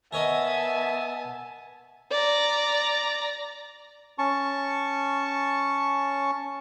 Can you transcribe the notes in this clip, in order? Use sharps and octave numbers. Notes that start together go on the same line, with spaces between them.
B3 A#4 C#5 D#5 E5 G#5 A5
D5 A#5
C#4 A5 C#6